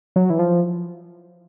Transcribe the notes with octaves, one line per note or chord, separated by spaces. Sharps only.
F#3
E3
F3